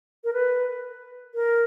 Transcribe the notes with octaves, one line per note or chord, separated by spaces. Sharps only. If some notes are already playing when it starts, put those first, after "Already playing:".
A#4
B4
A#4